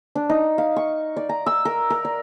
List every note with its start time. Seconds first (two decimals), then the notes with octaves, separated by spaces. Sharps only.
0.15 D4
0.29 D#4
0.58 F5
0.76 C#6
1.16 D5
1.29 A#5
1.46 E6
1.65 A#4
1.90 A#4
2.05 D5